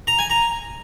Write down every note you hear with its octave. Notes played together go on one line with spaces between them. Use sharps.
A#5
G#5
A#5